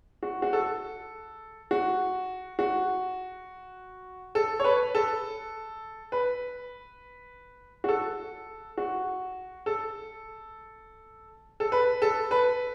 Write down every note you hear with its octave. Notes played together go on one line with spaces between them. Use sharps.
F#4
F#4
A4
F#4
F#4
A4
C#5
B4
A4
B4
F#4
A4
F#4
A4
A4
B4
A4
B4